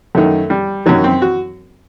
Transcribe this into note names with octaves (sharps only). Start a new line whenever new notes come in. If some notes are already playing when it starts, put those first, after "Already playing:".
F#2 D#3 A3
G3
F#2 D#3 F#3
C4
F#4